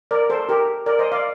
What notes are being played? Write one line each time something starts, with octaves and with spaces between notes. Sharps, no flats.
A#4 D5
A4 C5
G4 A#4
A#4 D5
C5 D#5
D5 F5